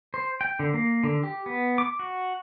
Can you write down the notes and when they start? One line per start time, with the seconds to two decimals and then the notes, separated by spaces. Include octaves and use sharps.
0.14 C5
0.41 G5
0.59 D3
0.74 A#3
1.04 D3
1.23 G4
1.46 B3
1.78 D6
1.99 F#4